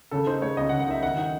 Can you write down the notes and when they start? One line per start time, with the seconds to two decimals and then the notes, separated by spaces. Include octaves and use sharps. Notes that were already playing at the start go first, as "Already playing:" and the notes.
0.11 C#3 A4
0.27 D#4 C5
0.42 G#3 C#5
0.57 C#2 D#5
0.69 F#5
0.72 C#3
0.80 F#5
0.88 D#4 E5
1.03 D#3 F#5
1.17 D#4 F#5